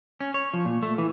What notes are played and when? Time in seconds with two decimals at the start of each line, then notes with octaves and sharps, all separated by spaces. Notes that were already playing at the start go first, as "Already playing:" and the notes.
0.21 C#4
0.34 C#5
0.54 F3
0.65 A#2
0.83 A3
0.98 E3